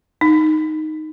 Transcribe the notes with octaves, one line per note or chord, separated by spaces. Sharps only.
D#4